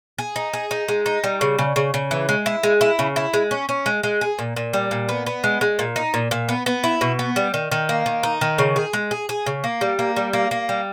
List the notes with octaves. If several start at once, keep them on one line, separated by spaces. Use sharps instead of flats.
G#4
D#4
G#4
D#4
G#3
D#4
G3
C#3
C#3
C#3
C#3
E3
G#3
E4
G#3
E4
C#3
E4
G#3
C#4
C#4
G#3
G#3
G#4
A#2
A#2
G3
A#2
B3
B3
G#3
G#3
A#2
D#4
A#2
A#2
B3
B3
E4
B2
B3
G3
D#3
D#3
A#3
D#3
D#4
D#3
C#3
G#4
G#3
G#4
G#4
C#3
A#3
G3
A#3
G3
A#3
A#3
G3